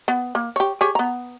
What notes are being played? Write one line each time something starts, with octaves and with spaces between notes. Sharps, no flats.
B3
A#3
G4 C#5
G4 G#4 C#5
B3 A#5